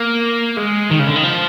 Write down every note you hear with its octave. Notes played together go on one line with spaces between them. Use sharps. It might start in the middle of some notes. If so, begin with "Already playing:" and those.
Already playing: A#3
G#3
D#3
C#3
D3
D#3
F3